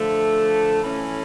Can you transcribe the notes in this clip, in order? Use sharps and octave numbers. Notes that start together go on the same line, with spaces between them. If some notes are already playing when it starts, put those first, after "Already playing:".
Already playing: D3 F3 A3
E3 A3 C#4